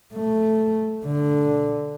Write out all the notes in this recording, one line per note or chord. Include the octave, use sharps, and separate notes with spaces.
A3
D3